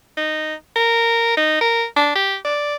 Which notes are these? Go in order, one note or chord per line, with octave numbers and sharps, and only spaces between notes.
D#4
A#4
D#4
A#4
D4
G4
D5